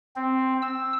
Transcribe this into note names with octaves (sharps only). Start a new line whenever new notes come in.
C4
E6